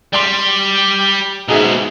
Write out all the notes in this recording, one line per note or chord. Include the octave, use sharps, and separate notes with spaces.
G3 D5 C6
G#2 B2 D#4 G#4 E5